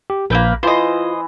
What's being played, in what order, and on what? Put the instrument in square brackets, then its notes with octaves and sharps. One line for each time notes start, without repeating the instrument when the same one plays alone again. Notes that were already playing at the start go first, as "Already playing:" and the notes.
[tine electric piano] G4
[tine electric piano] A#1 G6 [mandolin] A#3 C4 B4
[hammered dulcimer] E3 [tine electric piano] F4 [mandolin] C5 D#5